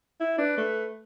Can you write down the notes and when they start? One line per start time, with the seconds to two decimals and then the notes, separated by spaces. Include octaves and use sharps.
0.20 E4
0.38 D4 B4
0.58 A3